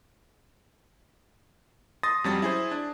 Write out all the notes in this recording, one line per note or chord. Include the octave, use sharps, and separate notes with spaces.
C6 D#6 A6 A#6
F2 F#3 G3 C#4 A6
E4 G#4 C5
D4